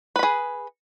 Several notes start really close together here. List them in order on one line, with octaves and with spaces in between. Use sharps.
B4 B5 G#4